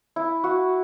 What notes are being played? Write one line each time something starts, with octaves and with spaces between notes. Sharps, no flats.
E4
F#4